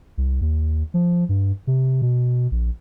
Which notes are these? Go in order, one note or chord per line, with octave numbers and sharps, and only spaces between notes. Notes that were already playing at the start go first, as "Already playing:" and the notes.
C2
D#2
F3
G2
C3
B2
A#1